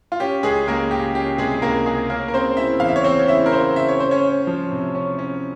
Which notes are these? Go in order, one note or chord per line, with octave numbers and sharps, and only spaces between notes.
F4
C#4 G4
C#2 G#3 G#4
C#2 A#3 A#4
C#2 G4
C#4 G4
C3 G#3 G#4
C#2 A#3 A#4
C#2 G#3 G#4
A#3 C#4 A#4
A#4
C#3 C4 C5
C#3 E4 E5
E2 F5
E5
C#5
C4 C#4 C5
C#5
C#3 E4 E5
A#4
C#3 C4 C5
C#3 E5
C#5
C#4 C5
C#4 C#5
C#4
F3
C3
C#4
C#4